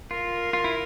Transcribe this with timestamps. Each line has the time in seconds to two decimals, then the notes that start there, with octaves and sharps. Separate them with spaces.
0.11 F4 A#4
0.53 F4
0.64 E4